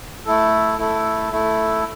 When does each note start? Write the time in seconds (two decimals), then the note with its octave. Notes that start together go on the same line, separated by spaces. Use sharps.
0.26 A3 E4 A4
0.78 A3 E4 A4
1.32 A3 E4 A4